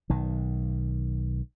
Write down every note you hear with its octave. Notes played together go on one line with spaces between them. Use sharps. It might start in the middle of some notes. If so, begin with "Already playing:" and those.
B1 D#3